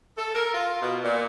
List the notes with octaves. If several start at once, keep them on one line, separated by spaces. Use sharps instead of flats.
A4
A#4
F4
B2
A#2